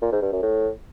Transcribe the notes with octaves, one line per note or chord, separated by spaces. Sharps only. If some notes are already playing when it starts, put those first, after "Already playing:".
A#2
G#2
G2
F#2
A2